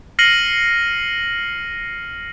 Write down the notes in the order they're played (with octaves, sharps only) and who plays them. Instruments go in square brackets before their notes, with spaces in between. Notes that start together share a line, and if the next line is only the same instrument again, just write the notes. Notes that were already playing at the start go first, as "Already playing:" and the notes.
[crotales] F6 A#6 C7 C#7 D#7 F#7